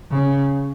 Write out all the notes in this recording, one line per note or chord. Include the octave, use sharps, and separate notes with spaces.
C#3